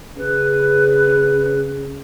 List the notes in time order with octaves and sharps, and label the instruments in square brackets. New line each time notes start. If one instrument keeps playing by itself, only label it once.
[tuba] C#3 [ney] B4